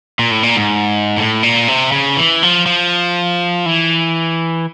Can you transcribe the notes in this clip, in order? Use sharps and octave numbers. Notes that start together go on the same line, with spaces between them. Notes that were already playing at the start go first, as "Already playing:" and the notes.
A#2
A2
A#2
G#2
A2
A#2
C3
C#3
E3
F3
F3
E3